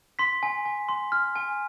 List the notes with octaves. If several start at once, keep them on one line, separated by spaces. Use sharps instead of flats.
C6 B6
G#5
G#5
C6
F6
G#5